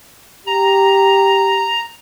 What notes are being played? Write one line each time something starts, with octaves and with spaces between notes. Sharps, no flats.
G4 A#5